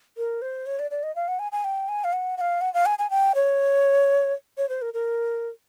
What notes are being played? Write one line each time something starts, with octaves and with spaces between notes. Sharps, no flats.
A#4
C5
C#5
D5
D5
D#5
F5
F#5
G#5
G#5
G5
G#5
F5
F#5
F#5
F5
F#5
F5
G#5
G#5
G5
C#5
C#5
C5
A#4
A#4